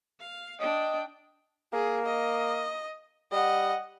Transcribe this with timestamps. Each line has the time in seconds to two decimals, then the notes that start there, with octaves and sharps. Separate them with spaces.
0.20 F5
0.60 D4 D#5 G5
1.73 A#3 G#4
2.06 D#5
3.32 G3 D#5 F#5